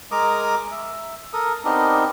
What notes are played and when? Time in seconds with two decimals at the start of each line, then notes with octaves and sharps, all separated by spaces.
0.12 G#3 A#4 A#5 D6 D#6
0.71 E5
1.33 A4 A#4 D#6
1.65 B3 C4 D4 D#4 G4 A#4